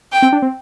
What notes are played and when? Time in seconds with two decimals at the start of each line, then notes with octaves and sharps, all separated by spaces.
0.12 G5
0.22 C4
0.33 D4
0.42 C4